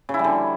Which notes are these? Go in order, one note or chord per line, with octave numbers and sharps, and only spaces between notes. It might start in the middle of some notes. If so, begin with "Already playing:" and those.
C#3
E4
G3
D3